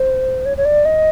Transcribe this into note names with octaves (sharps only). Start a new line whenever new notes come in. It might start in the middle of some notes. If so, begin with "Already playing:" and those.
Already playing: C5
C#5
C#5
D5
D#5